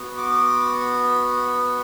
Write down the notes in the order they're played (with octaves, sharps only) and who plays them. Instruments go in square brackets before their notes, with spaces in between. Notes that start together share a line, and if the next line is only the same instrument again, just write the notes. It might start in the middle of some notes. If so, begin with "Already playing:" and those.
Already playing: [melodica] B3 F#4
D6